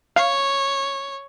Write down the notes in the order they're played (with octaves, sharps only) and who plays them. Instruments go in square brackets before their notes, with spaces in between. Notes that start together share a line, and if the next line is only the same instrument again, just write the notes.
[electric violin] C#5 [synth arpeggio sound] F5